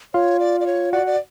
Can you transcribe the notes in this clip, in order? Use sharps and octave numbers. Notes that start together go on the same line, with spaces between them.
F4 C#5 F5
D5
D5
C#5
F#4 D5 F#5
D5